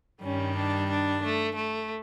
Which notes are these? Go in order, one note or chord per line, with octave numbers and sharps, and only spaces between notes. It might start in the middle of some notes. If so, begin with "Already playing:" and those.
G2 D#3 G3 C#4
D4
D4
A3
A3